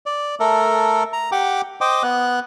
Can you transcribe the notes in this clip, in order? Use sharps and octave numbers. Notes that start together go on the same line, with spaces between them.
D5
A3 A4 A#4
A#5
G4 F#5 G5 D6
C5 D#5 G5 D6
B3 F#6